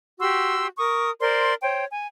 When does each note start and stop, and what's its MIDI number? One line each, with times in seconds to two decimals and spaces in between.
0.20 0.68 66
0.20 0.68 67
0.20 0.68 84
0.20 0.68 88
0.77 1.10 70
0.77 1.10 85
0.77 1.10 87
1.20 1.54 70
1.20 1.54 72
1.20 1.54 74
1.20 1.54 84
1.62 1.84 72
1.62 1.84 73
1.62 1.84 79
1.91 2.06 80